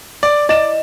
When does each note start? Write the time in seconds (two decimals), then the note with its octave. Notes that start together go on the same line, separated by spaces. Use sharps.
0.23 D5
0.49 E4 D5 D#5 E7